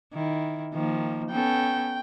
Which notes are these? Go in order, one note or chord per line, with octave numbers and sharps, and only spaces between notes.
D#3 E4
D#3 F3 A#3
B3 C#4 A4 G5